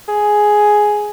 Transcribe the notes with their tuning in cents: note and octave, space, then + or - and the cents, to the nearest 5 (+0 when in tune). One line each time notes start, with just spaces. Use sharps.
G#4 +5